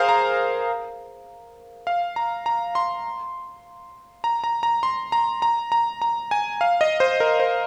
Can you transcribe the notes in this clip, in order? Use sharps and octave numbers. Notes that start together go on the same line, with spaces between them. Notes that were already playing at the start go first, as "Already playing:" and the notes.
Already playing: G#4 A#4 C5 F5
A#5
F5
A#5
A#5
C6
A#5
A#5
A#5
C6
A#5
A#5
A#5
A#5
G#5
F5
D#5
C5
A#4
C5